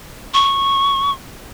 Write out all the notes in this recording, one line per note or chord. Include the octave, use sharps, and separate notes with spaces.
C#6